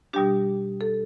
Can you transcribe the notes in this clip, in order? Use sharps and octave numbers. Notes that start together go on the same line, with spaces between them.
B2 G3 D4 G4
A4